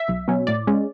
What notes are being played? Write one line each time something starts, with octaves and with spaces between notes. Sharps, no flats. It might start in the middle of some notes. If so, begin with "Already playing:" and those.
Already playing: E5
B1
B2 F#3 C#4
A2 D5
G#3 C#4